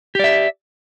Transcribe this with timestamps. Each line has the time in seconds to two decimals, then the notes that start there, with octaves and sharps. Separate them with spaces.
0.15 G4
0.19 D5
0.24 E5